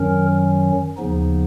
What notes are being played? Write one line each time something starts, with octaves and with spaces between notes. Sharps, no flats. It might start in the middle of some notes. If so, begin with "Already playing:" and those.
Already playing: F#2 D#3 F#3 C#4 A#4
D#2 C#3 F3 B3 D#4